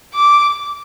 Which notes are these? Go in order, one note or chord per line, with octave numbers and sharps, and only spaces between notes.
D6